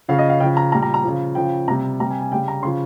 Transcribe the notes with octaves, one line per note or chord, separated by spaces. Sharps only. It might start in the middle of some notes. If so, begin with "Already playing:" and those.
C#3 F3 F5
D#5
F5
C#3 F3 G5
A#5
A#2 G3 A#5
A#5
A#5
C#3 F3
C#3 F3 G5
C3 G3 A#5
C3 G3 A#5
G#5
G#5
C#3 G3 G5
A#5
C#3 F3 C6